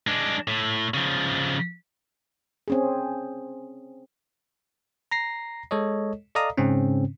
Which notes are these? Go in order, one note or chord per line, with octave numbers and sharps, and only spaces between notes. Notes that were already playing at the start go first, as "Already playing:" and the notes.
G#3 D4
A2
C#3 F3
C4 C#4 G#4
A#5 A#6 C7
G#3 A4 C#5 D#5
A4 D5 D#5 F5 A#5 D#6
G#2 C#3 C4 C#4